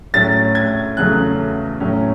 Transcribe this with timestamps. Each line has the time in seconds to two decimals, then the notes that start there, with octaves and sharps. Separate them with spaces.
0.14 A2 F#3 C#4 A6
0.55 G#6
0.97 E2 C#3 F#3 A3 F#6
1.80 A2 F#3 C#4